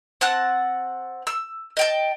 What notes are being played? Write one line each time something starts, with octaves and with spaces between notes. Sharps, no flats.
C4 F#5 A5 F#6
E6
D#5 G5 A5